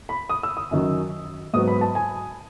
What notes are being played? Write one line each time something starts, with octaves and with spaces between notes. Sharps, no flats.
B5
D#6
E6
D#6
F#2 D#3 F#3
G#2 F#3 B3 D#6
B5
A5
G#5